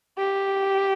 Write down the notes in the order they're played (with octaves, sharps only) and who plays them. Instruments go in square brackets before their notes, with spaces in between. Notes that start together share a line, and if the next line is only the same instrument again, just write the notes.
[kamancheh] G4